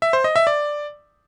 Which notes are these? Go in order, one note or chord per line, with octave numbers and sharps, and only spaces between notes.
E5
C5
D#5
E5
D5